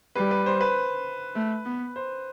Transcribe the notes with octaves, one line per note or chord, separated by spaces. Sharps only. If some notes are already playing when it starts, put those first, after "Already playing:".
G3 B4
B4
C5
B4
A3
B3
C5